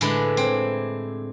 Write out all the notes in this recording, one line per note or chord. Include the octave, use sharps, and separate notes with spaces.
A2 D3 G#3 D4 E4 B4
C4